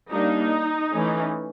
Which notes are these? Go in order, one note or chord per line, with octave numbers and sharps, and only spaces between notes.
G3 A#3 D4 D#4
E3 A3 C#4